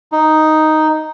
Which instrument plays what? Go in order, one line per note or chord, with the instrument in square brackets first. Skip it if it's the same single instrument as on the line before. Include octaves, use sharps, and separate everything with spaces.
[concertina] D#4